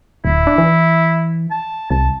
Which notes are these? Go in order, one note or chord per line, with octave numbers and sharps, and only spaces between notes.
D1 E4
D4
E3
A5
C2 A5